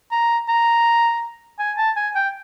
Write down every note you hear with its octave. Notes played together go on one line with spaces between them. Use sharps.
A#5
A#5
G#5
A5
G#5
G5